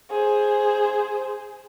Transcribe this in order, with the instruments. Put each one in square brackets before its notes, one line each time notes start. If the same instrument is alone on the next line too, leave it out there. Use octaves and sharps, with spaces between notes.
[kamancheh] G#4 C5